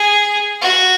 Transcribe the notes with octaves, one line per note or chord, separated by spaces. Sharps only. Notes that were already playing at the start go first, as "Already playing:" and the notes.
Already playing: G#4
F#4